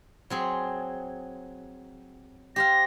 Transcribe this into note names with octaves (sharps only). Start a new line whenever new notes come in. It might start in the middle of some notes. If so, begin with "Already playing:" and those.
F#3 C4 G#4
G4 C5 F5 A#6